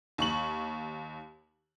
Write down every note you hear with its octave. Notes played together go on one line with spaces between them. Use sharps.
D#2 C#6 F#7